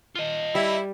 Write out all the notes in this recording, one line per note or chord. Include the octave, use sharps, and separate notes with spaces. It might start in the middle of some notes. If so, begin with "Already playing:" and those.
F4 D#5
G3 E4